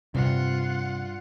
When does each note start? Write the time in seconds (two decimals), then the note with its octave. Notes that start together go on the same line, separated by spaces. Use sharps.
0.15 G2 C3 F4 F#5